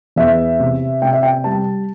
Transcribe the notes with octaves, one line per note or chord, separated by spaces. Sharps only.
E2 E5
C3
C3 G5
E5
G5
G3 A5